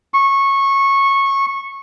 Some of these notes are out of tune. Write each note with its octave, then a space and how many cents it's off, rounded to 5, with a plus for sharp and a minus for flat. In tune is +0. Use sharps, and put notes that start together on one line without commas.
C#6 -15